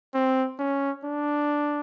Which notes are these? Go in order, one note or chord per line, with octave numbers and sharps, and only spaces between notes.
C4
C#4
D4